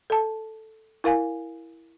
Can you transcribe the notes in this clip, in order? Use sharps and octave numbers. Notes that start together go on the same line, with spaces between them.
A4 A5
E4 A#4 F5 G#5